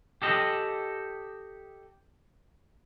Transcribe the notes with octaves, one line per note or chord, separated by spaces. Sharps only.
G4 A4 D#5